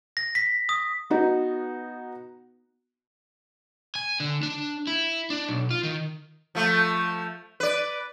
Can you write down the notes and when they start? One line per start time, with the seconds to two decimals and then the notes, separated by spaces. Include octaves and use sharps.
0.17 A#6
0.35 B6
0.69 D#6
1.10 B3 D#4 F#4
3.95 G#5
4.20 D3
4.43 D4
4.87 E4
5.30 D4
5.49 B1
5.70 F4
5.83 D#3
6.55 F3 A3
7.60 B4 D5